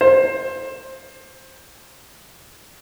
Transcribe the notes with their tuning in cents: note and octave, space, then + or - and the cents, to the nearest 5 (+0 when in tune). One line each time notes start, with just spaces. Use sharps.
C5 +20